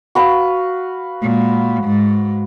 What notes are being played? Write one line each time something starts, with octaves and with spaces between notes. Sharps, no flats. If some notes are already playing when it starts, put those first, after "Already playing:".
F#4 B4 F5
A#2 G#3
G#2